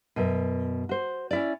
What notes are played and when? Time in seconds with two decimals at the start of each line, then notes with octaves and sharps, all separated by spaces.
0.16 F#2 B2
0.89 F#4 C5
1.31 C#4 E4 D5